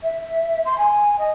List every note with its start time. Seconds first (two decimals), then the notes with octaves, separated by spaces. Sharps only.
0.03 E5
0.65 C6
0.78 G#5
1.19 D#5